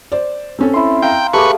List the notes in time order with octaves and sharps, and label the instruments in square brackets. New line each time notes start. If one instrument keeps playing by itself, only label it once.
[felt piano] C5 D5
C4 C#4 A4
[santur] E4 C6
[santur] F5 A#5 E6 [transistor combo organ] G5
[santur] A3 [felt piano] G4 G#4 D6 [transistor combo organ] B4 C#6